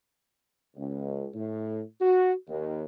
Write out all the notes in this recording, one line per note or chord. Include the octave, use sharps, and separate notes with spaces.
C#2
A2
F#4
D#2